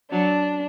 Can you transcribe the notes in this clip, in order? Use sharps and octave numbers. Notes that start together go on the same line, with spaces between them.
F#3 D4